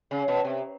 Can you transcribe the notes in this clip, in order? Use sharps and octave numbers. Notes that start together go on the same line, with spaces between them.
C#3
B2
C3